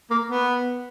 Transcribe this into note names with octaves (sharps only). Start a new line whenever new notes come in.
A#3
B3